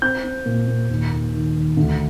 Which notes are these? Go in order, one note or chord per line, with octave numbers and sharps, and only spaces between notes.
C4 G6
C4
A#2
A#2
D#2
D#2
D#3
D#3
D2